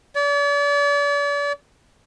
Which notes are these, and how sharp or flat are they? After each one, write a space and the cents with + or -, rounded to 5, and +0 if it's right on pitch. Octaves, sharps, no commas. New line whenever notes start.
D5 -40